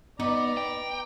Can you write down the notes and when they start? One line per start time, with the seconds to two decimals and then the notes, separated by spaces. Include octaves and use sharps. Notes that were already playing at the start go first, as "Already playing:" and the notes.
0.20 B3 D#4 B4 D5 A#5
0.57 G5